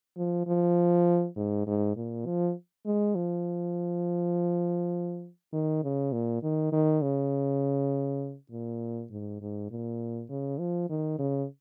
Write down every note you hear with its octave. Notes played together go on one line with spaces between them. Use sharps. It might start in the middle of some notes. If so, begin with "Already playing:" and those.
F3
F3
G#2
G#2
A#2
F3
G#3
F3
D#3
C#3
A#2
D#3
D#3
C#3
A#2
G#2
G#2
A#2
C#3
F3
D#3
C#3